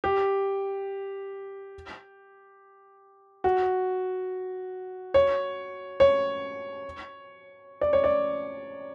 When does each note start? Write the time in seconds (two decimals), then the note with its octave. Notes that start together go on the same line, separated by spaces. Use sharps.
0.04 G4
3.44 F#4
5.14 C#5
6.00 C#5
7.81 D5
7.93 C#5
8.04 D5